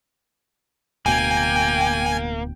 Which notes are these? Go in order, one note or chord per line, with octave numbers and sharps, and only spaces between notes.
D1 D2 B2 A#3 G5 G#5